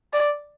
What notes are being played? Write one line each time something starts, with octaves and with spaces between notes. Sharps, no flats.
D5